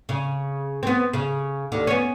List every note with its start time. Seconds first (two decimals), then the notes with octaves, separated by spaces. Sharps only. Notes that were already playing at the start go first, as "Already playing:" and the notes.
0.09 C#3
0.83 B3 C4
1.13 C#3
1.72 D#2 D3
1.87 B3 C#4